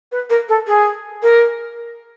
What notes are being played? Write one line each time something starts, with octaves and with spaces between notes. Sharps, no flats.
B4
A#4
A4
G#4
A#4